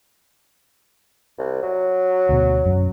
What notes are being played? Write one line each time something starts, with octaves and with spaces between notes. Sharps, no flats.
C2
F#3
D2 B2
F#2